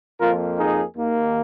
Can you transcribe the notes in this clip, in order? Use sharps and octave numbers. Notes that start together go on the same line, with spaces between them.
F2 F3 A#3 F4 A#4
D#4 G#4
D#2 D#3 A#3